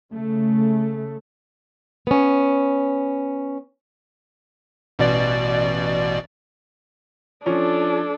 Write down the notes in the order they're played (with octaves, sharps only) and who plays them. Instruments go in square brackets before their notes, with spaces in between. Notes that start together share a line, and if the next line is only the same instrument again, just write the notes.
[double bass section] C#3 A3
[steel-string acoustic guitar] B3 C#4
[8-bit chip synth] A1 B2 D5
[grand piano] F3 C#4 [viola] D4 A4